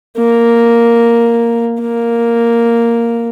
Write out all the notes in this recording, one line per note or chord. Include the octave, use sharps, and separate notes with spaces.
A#3
A#3